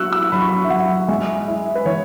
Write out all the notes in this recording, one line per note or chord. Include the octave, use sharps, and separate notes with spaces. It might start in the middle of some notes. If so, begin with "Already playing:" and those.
Already playing: F#3 F#4 C#6 E6 F#6
E6
F#3 B5
C#6
B5
E5
F#3 F#5
G#3 E5
E4
B4
E3 C#5